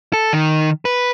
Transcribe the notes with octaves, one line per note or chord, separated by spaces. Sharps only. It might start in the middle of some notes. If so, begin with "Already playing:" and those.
A4
D#3
B4